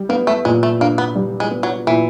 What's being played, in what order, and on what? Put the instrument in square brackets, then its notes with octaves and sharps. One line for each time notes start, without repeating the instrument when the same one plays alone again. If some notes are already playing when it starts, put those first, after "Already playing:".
Already playing: [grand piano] G3
[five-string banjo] A#3 [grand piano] B3
[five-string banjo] A3
[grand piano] A#2 [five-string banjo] G#3
[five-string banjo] A3
[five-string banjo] A#3 [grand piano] D4
[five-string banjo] B3
[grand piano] G3
[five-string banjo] G#3
[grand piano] B3
[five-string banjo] F#3
[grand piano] A#2 [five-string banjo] E3